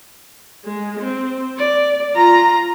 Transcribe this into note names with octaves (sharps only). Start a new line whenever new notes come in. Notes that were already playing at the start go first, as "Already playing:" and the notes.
G#3
C4
D5
F4 A#5